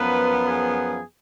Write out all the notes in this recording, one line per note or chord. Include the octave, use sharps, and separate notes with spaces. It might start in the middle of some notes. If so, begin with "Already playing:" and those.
Already playing: F#2 F3 B3 B4
G#4